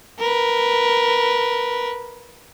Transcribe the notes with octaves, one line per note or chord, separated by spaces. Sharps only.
A#4 B4